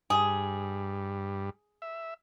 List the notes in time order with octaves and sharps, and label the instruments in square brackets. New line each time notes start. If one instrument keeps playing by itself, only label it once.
[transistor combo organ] G2 [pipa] G#4
[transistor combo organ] E5